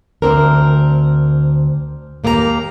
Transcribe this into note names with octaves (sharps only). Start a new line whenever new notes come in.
D2 C4 D4 A#4
D#2 A#3 G4 G#4 A#5